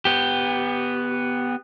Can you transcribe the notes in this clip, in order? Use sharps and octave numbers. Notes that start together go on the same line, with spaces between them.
B3 G4